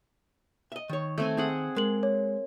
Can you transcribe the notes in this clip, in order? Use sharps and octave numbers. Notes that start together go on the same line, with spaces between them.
D#5 E5
D#3 C#5
A3 C4 G#5
C4 G#4 F#5
G#3 A#4 F#7
C#5